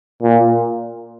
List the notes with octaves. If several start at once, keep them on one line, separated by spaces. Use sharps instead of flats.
A#2